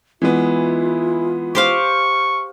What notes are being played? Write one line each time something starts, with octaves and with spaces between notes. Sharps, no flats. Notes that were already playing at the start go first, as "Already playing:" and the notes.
E3 G#3 B3 E4 F4
G4 C5 F5 C#6